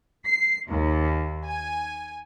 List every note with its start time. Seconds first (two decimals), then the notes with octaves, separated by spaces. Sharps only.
0.24 C7
0.69 D#2
1.46 G#5